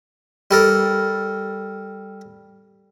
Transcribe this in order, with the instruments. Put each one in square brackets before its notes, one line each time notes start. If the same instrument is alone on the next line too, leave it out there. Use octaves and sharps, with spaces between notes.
[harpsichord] G3 A4 A#4